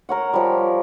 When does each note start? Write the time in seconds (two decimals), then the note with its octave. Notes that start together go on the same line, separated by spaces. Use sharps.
0.09 A#4 C#5 F#5
0.34 F3 G3